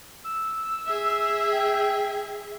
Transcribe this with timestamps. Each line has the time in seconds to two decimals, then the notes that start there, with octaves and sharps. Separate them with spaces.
0.24 E6
0.86 G#4 E5
1.52 G5